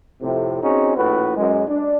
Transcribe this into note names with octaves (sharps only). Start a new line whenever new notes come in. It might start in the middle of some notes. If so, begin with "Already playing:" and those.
F2 A2 C3
C4 C#4 D#4 F#4 G#4
A#1 A2 F#4 B4
F#2 G#3
D4